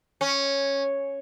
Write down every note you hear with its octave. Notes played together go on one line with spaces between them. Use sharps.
C#4